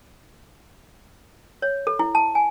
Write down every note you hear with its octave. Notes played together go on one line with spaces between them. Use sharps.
C#5
A4
E4
A5
G#5